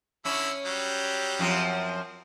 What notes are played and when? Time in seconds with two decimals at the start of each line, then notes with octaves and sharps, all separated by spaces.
0.25 D3 C#4 E4 E6
0.66 F#3 G3 G4
1.39 F#2 F3 C4